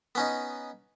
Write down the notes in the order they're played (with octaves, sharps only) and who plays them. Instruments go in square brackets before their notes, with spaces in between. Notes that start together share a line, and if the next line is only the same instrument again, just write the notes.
[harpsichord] B3 C#4 D#4